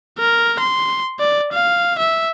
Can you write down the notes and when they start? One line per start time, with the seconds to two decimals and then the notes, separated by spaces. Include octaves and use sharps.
0.18 A#4
0.59 C6
1.19 D5
1.52 F5
1.99 E5